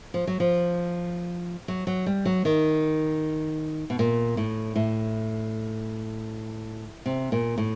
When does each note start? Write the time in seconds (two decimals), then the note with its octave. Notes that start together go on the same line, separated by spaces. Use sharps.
0.14 F3
0.27 F#3
0.40 F3
1.68 F#3
1.87 F#3
2.06 G3
2.25 F#3
2.45 D#3
3.90 B2
3.99 A#2
4.37 A2
4.76 A2
7.06 C3
7.32 A#2
7.58 A2